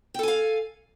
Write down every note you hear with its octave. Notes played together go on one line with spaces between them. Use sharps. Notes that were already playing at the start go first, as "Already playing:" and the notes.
A4 F5 G5 G#5